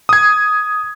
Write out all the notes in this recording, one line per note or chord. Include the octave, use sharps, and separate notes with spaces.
D#6 G#6